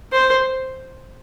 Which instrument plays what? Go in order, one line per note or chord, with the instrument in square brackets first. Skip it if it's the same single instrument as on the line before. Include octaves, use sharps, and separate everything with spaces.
[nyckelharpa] C5